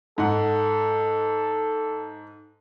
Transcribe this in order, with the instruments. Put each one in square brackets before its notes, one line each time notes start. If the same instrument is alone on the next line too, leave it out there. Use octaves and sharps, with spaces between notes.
[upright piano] G#2 F#5 [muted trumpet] A4